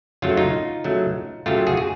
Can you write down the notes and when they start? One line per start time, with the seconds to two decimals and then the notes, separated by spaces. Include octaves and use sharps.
0.22 C#3 F#3 A3 F4
0.30 F#4
0.37 D#4 F4
0.84 C#3 F#3 A3
1.46 C#3 F#3 A3 F4 G4
1.67 F#4 G#4
1.77 G#4